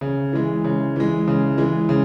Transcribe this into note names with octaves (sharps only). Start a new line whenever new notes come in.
C#3
E3 G#3
C#3
E3 G#3
C#3
E3 G#3
C#3